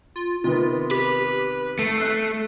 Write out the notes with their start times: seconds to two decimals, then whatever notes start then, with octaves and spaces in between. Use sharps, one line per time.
0.16 F4
0.44 C3 D#3 B3 F4
0.91 G4 B4
1.79 A3 C7
1.97 E6 F#6